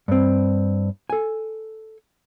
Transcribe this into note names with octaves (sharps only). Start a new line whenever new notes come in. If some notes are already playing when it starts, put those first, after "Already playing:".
G2 C4
A4 G#5